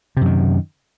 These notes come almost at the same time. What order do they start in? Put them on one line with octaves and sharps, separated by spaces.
C3 F#2 D#3